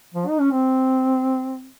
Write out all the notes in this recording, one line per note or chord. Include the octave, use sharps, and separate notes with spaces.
F3
D#4
C#4
C4